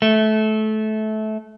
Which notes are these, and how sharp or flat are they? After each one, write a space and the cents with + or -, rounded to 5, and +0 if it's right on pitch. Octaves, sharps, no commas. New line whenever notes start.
A3 -20